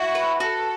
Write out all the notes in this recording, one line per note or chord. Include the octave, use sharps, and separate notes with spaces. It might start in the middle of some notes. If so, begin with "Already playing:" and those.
Already playing: E4 F#4
B4
F#4 A4